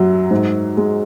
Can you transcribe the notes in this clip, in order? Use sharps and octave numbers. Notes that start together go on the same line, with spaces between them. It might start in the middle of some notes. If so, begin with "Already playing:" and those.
Already playing: F#2 F#3
G#2
G#3